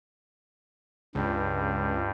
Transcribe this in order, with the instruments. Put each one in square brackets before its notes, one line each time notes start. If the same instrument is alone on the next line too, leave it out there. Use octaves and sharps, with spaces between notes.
[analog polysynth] C#2 [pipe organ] G2